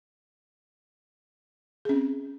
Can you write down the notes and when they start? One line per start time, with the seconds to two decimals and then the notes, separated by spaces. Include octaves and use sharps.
1.85 G#4
1.89 C#4
1.93 C4